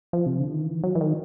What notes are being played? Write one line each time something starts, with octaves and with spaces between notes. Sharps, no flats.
F3
C3
D3
D#3
E3
F#3
E3
D#3